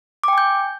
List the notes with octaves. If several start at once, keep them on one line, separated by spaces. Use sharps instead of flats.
G5 G#5 D6 G6